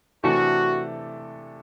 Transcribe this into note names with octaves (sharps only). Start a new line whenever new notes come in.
C3 E3 A3 D4 F#4 A4